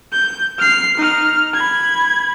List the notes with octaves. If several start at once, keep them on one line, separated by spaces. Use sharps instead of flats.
G6
F6 C7
D#4 F6
B5 G#6